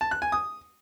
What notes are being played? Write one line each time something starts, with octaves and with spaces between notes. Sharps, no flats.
A5
F#6
G#5
D#6